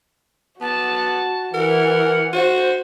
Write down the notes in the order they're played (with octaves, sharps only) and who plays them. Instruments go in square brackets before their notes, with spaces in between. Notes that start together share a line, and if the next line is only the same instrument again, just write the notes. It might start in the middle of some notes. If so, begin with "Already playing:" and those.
[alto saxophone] B3 [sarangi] F#4 [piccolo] A5
[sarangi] E3 [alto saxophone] A#4 [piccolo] F#5
[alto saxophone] F#4 [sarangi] C5